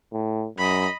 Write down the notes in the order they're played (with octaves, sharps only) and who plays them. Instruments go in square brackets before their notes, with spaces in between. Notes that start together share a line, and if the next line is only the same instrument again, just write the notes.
[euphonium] A2
[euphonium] F#2 [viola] D#5 B5